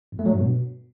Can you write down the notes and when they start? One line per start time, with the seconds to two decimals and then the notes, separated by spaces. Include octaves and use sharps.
0.12 F2
0.19 A3
0.26 F#3
0.32 G2
0.39 B2